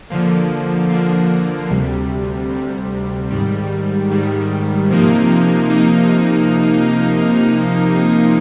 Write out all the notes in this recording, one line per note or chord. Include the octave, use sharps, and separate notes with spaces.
D3 F3 A#3
D3 F3 A#3
D2 C3 G3
D2 C3 G3
G#2 D#3 G3
G#2 D#3 G3
C3 F3 A#3 D#4
C3 F3 A#3 D#4